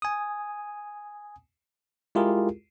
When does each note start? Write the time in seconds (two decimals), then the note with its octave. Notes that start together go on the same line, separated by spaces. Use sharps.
0.02 G#5 D#6
2.15 G#3 E4 F4 G4 G#4 A#4